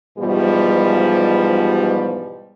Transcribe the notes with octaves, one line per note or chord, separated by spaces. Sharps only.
G#2 B2 E3 F3 G3